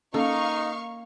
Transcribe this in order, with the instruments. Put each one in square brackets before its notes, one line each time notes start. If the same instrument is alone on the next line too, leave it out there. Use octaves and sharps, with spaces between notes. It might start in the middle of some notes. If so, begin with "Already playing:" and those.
[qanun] A#3 [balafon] C#4 A4 [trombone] D#4 [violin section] F5 C#6